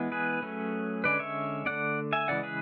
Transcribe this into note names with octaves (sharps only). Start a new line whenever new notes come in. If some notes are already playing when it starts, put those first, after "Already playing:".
Already playing: E3 G#3 B3
G#4 B4
F#3 A3 C#4
D3 G#3 C#4 B4 D5
C#5 E5
D3 A3 C#4 D5 F#5
E5 G#5
C#3 E3 G#3 D5 F#5
G#4 B4